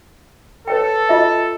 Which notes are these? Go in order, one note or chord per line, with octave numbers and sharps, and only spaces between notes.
A4 B4 C#5 G5
F4 D#5 E5